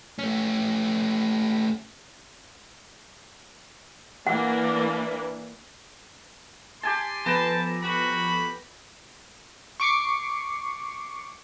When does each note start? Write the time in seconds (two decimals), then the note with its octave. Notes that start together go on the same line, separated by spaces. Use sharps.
0.19 A3 C#4
4.27 E3 A#3 D4 F#5
6.83 G4 G#5 A5 C6
7.26 F3 B3 A4 B4 G5 A5 A#5
7.84 F#4 B5
9.80 C#6 D6 C7 C#7